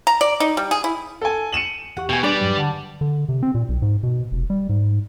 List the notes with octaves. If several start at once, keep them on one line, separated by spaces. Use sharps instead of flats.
A#5
D5
D#4
G3
G#4
E4
A4 G#5
C#7 D#7 E7 F#7
E2 G4 F#5 C#6
B2 G5 G#5
G3 D4 B4 D5
E2 G2 F#3
D3 F#5 A5
D3
C3
C4
A#2
B1
G#2
B2
F1
G3
G#2